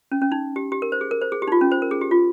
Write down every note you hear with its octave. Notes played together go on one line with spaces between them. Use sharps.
C#4
C#4
D#4
G4
G4
A#4
C5
G#4
A#4
C5
G#4
G4
D#4
F4
C#4
C5
A#4
G#4
G4
F4